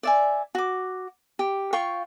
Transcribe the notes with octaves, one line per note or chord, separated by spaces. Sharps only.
D5 E5 G#5
F#4 D6
G4
F4 F5 G5 C#6